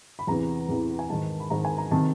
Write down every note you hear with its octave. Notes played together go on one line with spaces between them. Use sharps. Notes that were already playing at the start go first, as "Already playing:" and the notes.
B5
E2 C3 E3 A#5
E2 C3 E3
G#5
G#2 D#3 A5
B5
G#2 D#3 A#5
G#5
A#5
C3 D#3 A5